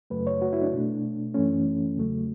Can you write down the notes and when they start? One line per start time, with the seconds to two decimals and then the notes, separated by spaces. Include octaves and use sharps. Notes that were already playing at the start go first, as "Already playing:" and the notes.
0.10 F#2 C#3 F#3 A3 B4
0.27 C#5
0.42 F#4
0.53 E4
0.62 D4
0.73 B2 A3
1.34 F#2 E3 A3 C#4
1.97 E2 C#3 F#3 A3